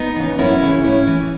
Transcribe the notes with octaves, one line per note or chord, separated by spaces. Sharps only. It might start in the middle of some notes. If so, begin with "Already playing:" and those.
Already playing: B3 D#4
C#3 E3
F#2 C#4 E4
C#3 E3
A2 C#4 E4
E3